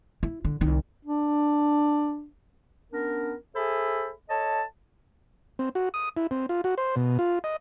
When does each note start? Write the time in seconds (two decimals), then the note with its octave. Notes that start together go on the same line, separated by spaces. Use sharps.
0.23 E4
0.45 D3
0.61 C2 D#3
1.05 D4
2.92 B3 C#4 D4 A#4
3.55 G#4 A4 C5 E5 B5
4.29 A4 C#5 D#5 A5
5.59 C4
5.75 F#4
5.94 D#6
6.17 E4
6.31 C4
6.49 F4
6.64 F#4
6.78 C5
6.96 B2
7.19 F4
7.44 D#5